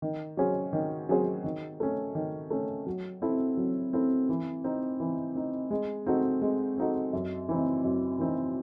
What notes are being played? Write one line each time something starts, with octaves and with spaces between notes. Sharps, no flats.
D#3
F#3 C#4 G#4 C5
D#3
F#3 C#4 G#4 C5
D#3
A3 C#4
D#3
A3 C#4
F#3
C4 E4 A4
F#3
C4 E4 A4
E3
C4 D#4
E3
C4 D#4
G#3
C4 D#4 F#4 A4
G#3
C4 D#4 F#4 A4
F#2
E3 C4 D#4
F#2
E3 C4 D#4